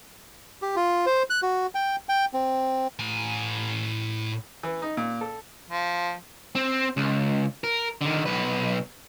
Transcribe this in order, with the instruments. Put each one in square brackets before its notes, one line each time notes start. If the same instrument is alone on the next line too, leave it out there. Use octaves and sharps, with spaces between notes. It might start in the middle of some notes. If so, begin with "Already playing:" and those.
[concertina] G4
F4
C5
F#6
F#4
G5
G5
C4
[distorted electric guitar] A2 G#5
[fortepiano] E3
D#4
A#2
A4
[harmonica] F3
[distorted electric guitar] C4
C#2
A#4
D3 D#3
B1 B4